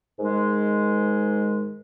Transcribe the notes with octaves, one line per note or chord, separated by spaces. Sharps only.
G#2 D#3 G#3